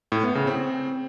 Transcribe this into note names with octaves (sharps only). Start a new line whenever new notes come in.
A2
B3
C#3
C4